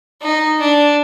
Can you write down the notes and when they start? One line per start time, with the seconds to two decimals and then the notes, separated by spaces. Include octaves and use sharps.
0.21 D#4
0.60 D4